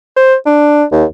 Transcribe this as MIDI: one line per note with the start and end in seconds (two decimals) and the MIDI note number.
0.16 0.35 72
0.46 0.84 62
0.92 1.04 39